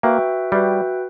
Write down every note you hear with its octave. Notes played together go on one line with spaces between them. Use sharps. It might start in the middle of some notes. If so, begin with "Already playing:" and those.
A#3 F#4 B4 E5 G5
G3 F#4 B4 E5 G5